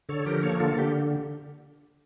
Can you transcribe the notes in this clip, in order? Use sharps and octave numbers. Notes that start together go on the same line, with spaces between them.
D3 A4 C#5
F3 G4 A#4
A#3 A4 C#5
D3 F4 A4
D3 G4